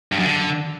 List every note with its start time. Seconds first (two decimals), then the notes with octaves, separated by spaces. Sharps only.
0.12 G2
0.19 F#2
0.25 D3